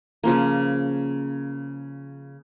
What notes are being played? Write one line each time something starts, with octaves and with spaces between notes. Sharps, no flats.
C#3 F3 A#3